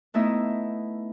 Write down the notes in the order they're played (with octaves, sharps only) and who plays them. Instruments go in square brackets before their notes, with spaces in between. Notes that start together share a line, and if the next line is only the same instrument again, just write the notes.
[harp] A3 B3 D#4 E4 D#5 E5